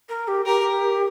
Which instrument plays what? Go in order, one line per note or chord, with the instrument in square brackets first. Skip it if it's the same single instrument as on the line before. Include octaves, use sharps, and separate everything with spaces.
[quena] A#4
G4
[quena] G4 [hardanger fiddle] A#4